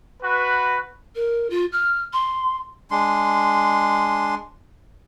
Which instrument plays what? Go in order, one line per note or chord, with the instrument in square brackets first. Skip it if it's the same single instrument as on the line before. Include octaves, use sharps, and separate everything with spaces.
[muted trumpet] F#4 [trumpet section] B4
[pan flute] A#4
F4
F6
C6
[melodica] G#3 D4 C6